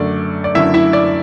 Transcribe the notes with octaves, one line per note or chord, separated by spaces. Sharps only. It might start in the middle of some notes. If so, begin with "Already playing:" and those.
Already playing: F#2 D3 A3 D5
D5
F#2 D3 A3 E4 E5
E4 E5
D5